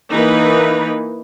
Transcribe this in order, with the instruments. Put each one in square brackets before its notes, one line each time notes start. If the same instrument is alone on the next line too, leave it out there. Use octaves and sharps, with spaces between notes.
[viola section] E3 A#3 D#4 B4